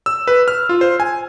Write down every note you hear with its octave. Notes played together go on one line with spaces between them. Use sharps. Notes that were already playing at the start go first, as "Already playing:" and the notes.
E6
B4
F6
F4
C5
G#5